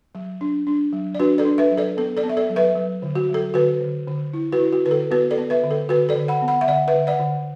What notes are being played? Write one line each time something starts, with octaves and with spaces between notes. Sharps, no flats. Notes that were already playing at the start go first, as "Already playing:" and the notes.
F#3
D4
D4
F#3
D5
D4 F#4 B4
A4 D5
D4
B4 E5
F#3
A4 D5
B3 A4
A4 D5
B3
E5
A4 D5
F#3
B4 E5
F#3
D3
F#4
F#3
A4
D3 F#4 B4
D3
D3
E4
F#4 B4
E4
F#4
D3 B4
A4
B3 F#4 B4
A4 D5
B3
B4 E5
D3
A4
D3 F#4 B4
A4 D5
D3
F#5 B5
B3
F#5 B5
E5
D3 D5 F#5
B4 E5
D3
D5 F#5
D3